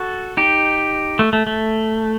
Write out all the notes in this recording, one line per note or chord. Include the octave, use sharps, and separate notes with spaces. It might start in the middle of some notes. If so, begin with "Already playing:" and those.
Already playing: F#4 A4
D#4 G4
A3
A3
A3